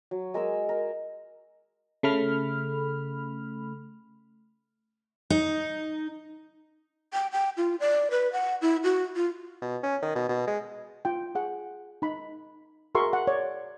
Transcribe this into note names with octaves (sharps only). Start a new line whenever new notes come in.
F#3
G#3 A#4 G#5 E6
A#4
C#3 A3 B5 F6
D#4
G5
G5
F4
D5
B4
F#5
E4
F#4
F4
B2
C#4
D#3
B2
B2
G#3
F4 G5
G#4 F#5
D#4 B5
F#4 G#4 A#4 E5 C6 C#6
F#5
C#5 D5